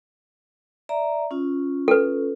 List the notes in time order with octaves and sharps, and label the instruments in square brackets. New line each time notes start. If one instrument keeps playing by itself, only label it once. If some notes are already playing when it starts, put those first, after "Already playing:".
[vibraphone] D5 E5 A#5
C#4 F4
[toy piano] A4 B4